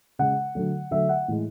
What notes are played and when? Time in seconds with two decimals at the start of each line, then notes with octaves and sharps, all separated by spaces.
0.19 C#3 G#3 F#5
0.55 D3 F#3 A3
0.91 D3 F#3 A3 E5
1.09 F#5
1.28 A2 E3 G#3